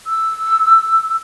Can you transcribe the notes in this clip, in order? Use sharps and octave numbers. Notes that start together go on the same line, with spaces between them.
E6